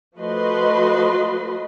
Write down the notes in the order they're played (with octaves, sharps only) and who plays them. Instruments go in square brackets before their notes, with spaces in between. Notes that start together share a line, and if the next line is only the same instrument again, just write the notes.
[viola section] F3 A3 F#4 B4 D#5 C6